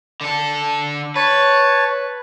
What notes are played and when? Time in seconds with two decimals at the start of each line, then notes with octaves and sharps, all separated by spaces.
0.21 D3 A4
1.16 B4 C#5 A5